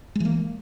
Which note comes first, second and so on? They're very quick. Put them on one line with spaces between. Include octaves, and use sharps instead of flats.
G#3 E3 A#3